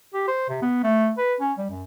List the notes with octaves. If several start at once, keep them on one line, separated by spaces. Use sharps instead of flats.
G4
C5
C3
B3
A3
B4
C#4
G3
F#2